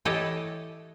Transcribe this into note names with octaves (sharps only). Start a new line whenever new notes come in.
E3 G4 A4 C#5 D#5